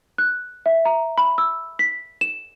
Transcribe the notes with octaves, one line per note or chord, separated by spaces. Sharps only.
F#6
E5
A#5
B5
E6
B6
E7